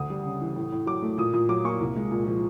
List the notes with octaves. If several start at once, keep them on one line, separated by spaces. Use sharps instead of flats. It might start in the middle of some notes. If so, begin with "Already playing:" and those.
Already playing: D2 D#6
G3
C#3
E3
A2
A2
F#3 D6
A3
A#2 D#6
A#2 D#6
F#3 D6
A#3 C#6
C2
G#3
A#2
F3